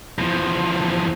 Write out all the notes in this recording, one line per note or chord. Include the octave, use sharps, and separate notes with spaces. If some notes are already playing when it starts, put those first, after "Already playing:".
E2 F3